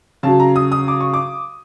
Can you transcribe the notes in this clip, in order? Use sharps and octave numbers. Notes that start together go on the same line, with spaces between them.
C#3 F#3 A5
A#5
D#6
D#6
D6
C#6
D6